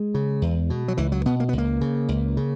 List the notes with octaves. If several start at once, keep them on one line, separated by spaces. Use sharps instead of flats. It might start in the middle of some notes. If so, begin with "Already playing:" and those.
Already playing: G#3
C#3
E2
B2
F#3
C#2 E3
F#3
B2 B3
A#3
B3
C#2
A#3
C#3
C#2
C#3